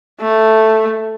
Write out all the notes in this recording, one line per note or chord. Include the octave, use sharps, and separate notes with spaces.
A3